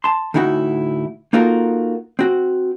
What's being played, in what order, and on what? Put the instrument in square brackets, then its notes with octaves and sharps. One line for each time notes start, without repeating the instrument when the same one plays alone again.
[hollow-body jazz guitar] A5 C6
D2 A2 D#4 E4 F#4 F#5
A#3 D#4 F4 F#4 A4 A#4
C4 F#4